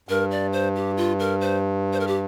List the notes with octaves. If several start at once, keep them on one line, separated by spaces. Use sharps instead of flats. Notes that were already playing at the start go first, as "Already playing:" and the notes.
G2 A#4
D5
C5
G4
F4
A#4
C5
C5
A#4
G4